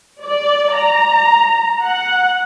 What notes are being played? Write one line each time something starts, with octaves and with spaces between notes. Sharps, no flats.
D5
A#5
F#5